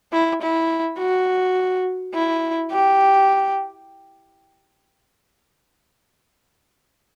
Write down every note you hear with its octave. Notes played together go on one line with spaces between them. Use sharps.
E4
E4
F#4
E4
G4